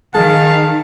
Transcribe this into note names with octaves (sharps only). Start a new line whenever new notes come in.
D#3 G#4 F5 A5